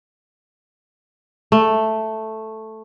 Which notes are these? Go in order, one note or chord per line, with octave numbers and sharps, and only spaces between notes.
A3